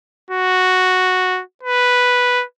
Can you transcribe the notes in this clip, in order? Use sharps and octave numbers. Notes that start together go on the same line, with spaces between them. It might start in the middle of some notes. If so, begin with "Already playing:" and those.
F#4
B4